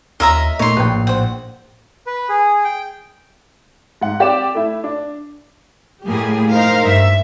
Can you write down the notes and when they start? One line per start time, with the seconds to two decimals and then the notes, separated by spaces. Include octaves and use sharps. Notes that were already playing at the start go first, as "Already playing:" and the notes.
0.20 D#2 C#4 F4 A#4 D#5 E5 A#5
0.59 A#2 A3 A#3 D#4 C#5 D#5 C6
0.77 A#1 B4 G5
0.94 A2
1.07 C5 F#5 G5
2.07 B4
2.29 G#4
2.64 G5
4.01 G#2 F#5
4.20 C4 G4 D5 D6 E7
4.55 A3 E4
4.84 D4
6.06 A2 G3 A3 A#3 G4 G#4
6.52 D#4 A#4 C5 F5
6.86 G2 E5